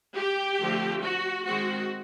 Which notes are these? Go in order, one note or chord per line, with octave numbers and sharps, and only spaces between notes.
G4
D3 F3 A3 C4
F#4
D#3 G#3 C4 F#4